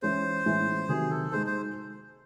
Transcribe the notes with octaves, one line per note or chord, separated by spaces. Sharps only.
E3 G#3 C#4 G#4 C5
A2 E3 G#3 C#4
C3 D#3 F#3 G#4
A4
G#3 D#4 G#4 C5
C5